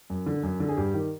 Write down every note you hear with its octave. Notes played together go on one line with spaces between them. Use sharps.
F#2
D3
F#2
D3
G#4
G2 G4
D#3